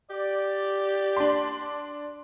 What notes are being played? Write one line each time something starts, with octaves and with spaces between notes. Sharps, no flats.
G4 D5
D4 C6